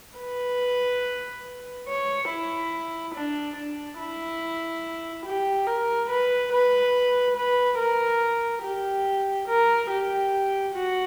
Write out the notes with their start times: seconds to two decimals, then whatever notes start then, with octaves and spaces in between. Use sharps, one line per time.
0.18 B4
1.88 C#5
2.29 E4
3.14 D4
3.55 D4
3.99 E4
5.25 G4
5.66 A#4
6.09 B4
6.52 B4
7.36 B4
7.79 A#4
8.62 G4
9.47 A#4
9.90 G4
10.74 F#4